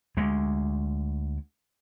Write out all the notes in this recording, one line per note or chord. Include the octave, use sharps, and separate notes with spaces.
D2 G#3